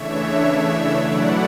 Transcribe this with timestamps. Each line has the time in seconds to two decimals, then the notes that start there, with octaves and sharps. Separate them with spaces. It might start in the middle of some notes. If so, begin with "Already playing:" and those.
Already playing: C#3 E3 A3 D4 C#5 E5
0.96 B2 F#3 A3 E4 D5 F#5